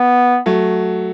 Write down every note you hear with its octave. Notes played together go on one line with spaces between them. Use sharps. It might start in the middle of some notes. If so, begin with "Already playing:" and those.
Already playing: B3
F#3 A3